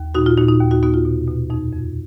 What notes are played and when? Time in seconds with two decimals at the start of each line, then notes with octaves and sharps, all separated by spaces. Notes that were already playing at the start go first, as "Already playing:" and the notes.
Already playing: D#2
0.15 A#2 D#4 F#4
0.26 F4
0.37 A#2 D#4 F#4
0.48 D#4
0.61 D#2
0.71 D#4 F#4
0.83 B3 D#4 F#4
0.94 F4
1.05 B2
1.28 B2
1.50 F2 D#4
1.73 F2